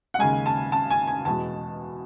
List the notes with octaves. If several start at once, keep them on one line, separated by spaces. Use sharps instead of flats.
F#5
D#2 C#3 G#3 G#5
A5
A5
G#5
G#5
E2 B2 G#3 A5